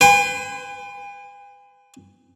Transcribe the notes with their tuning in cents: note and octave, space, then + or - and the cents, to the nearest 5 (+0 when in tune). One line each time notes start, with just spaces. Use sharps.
B4 +40 G#5 -45 C6 +0